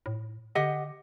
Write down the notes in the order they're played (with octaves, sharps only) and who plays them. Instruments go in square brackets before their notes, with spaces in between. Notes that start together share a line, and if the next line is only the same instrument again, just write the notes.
[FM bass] A2
[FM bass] D3 [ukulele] G4 D#5 F#5